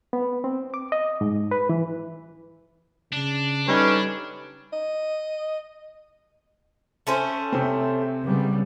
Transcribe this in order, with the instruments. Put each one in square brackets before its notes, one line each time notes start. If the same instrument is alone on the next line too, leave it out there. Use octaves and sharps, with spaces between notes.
[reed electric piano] B3
C4
D6
D#5
G#2
B4
E3
[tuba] C#3 [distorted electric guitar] D4
[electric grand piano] G3 D#4 A4 [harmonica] C#4 B4
[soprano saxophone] D#5
[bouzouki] A3 C#4 C5
[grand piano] C3 C4
[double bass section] C#3 G3 B3